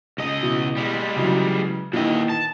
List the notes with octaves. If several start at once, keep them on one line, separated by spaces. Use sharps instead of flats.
C#2 D#5
B2 E3
G3 G#3
C#3 E3 F#3
A#2 D#3 E3 D#5
A5